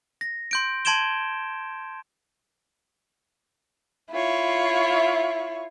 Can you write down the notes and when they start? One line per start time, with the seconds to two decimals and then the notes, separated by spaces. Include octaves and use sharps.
0.21 A#6
0.51 C6 G6 D7
0.85 A5 C6 G#6 D7 E7 G7
4.13 E4 F4 C#5